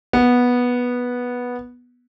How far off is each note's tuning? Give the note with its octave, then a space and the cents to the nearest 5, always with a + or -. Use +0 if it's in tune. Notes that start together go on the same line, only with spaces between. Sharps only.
B3 -10